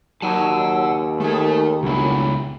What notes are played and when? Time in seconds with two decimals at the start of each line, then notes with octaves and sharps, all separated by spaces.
0.22 D#2 F#3 D#4 F#5 A5 E6
1.20 D#3 A3 G#4 A4
1.83 G1 C#2 F#3 E4